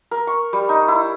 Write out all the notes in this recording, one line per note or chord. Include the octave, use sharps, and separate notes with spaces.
A#4
C#6
G3
D#4
E4